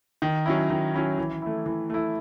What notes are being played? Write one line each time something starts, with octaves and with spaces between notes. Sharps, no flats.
D#3
F#3 C#4 E4
D#3
F#3 C#4 E4
E3
A3 E4
E3
A3 E4